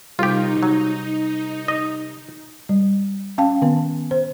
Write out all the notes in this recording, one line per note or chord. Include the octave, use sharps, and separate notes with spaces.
C2 D#4 F4 G4
F#3
D#5
G3
C#4 F5 G5 A5
D#3 B3
C5